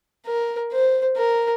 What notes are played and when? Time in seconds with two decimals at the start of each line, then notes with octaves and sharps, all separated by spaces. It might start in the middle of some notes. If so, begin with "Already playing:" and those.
0.26 A#4
0.72 C5
1.17 A#4